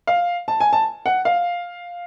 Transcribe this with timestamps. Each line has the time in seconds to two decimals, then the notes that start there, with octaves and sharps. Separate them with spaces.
0.07 F5
0.48 A5
0.60 G#5
0.73 A5
1.06 F#5
1.25 F5